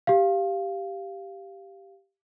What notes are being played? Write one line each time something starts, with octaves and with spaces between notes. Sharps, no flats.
G4 F5